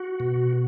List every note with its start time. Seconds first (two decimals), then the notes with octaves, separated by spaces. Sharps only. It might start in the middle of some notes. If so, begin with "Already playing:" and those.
Already playing: F#4
0.20 B2